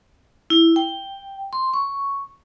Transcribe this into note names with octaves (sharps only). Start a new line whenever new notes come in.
E4
G5
C6
C#6